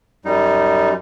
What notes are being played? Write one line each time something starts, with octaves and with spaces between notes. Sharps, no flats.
F#2 G3 D#4